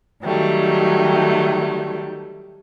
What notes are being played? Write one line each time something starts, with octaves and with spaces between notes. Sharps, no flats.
D#3 F#3 G3 A3